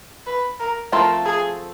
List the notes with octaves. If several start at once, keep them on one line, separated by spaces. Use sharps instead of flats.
B4
A#4
F3 A3 C4 F4 A4 A#4
G#4